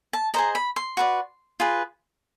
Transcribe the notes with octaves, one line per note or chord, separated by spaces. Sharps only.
A5
G#4 C5 D#5 A#5
B5
C6
F#4 B4 D5
F4 G#4 B4